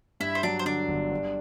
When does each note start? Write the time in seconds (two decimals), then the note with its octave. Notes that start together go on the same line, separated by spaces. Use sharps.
0.20 G2 E4 E5
0.35 C5
0.43 F#3 D4 D5
0.59 C5
0.66 D3 D4 D5
0.88 G1
1.11 G2